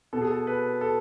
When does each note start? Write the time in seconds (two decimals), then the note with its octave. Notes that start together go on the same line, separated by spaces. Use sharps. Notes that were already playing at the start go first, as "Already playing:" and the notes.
0.13 B2 A4
0.22 G#4
0.31 A4
0.47 B4
0.81 A4